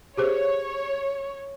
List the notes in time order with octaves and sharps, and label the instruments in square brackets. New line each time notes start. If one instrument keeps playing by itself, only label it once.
[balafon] G4 G#4 C5 [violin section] C#5